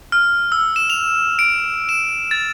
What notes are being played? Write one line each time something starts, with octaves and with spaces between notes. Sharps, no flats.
F6
E6
E7
F7
D7
E7
A6